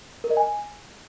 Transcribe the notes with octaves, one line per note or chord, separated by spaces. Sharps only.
A#4
D#5
G#5